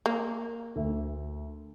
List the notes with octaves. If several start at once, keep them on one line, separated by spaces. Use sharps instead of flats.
A#3
D2 E5